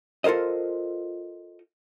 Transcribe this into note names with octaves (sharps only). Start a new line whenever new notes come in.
F4 A4 A#4 C5 D#5